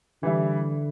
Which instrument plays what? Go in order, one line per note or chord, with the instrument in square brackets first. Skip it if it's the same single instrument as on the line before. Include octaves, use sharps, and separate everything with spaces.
[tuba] D3 [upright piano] E3 G3 E4